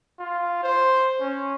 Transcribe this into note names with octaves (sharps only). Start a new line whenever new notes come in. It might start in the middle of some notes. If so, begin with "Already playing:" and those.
F4
C5
C#4